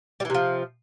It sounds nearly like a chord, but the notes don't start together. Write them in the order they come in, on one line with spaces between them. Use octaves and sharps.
G3 E3 C3 F3